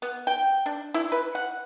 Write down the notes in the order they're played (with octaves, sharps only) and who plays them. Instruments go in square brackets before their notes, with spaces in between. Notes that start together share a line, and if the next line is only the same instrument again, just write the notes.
[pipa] B3
G5
D4
E4
B4
F#5